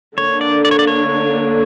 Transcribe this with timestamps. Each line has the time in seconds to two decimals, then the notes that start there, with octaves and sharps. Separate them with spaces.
0.18 D3 A#3 D4 C#5
0.41 D5
0.65 D5
0.71 C#5
0.79 D5
0.87 C#5